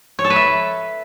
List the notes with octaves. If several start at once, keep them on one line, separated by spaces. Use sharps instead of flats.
C#5
A4
B4
E5